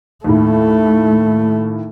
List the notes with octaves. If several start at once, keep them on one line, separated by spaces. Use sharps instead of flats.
D#2 A2 A3